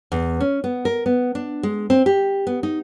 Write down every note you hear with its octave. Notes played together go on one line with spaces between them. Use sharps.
E2
C#4
B3
A#4
B3
D4
G#3
C4
G4
B3
D#4